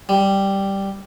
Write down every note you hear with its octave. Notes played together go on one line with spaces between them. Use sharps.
G3